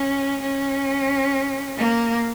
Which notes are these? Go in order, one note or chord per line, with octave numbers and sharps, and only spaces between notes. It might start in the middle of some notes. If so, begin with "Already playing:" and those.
Already playing: C#4
C#4
A#3